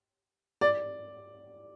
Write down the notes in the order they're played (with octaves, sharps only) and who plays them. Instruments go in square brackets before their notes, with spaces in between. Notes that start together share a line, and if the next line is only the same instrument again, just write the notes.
[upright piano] D5